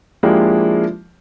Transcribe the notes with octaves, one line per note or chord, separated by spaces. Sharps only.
F3 G#3 A#3 D4 E4 G4